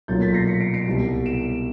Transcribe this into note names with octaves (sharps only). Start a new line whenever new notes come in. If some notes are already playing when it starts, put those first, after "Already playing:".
B1 A#2 F#3 G6 A6
A6 B6
A#6 C7
B6 C#7
C7 D7
C7 D7
C2 B2 G3
D7 E7